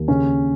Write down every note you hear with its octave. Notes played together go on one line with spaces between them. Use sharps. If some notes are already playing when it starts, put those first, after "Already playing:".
Already playing: D#2
C#3 C#4